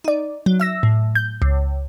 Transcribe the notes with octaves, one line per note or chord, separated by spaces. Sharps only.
D#4 D5
F#3
E5 E6 A#6
A2
G6
C#2